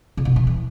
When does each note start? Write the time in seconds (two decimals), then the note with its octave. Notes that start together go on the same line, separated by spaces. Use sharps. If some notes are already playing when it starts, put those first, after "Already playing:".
0.17 C#3
0.25 B2
0.36 E3
0.47 E3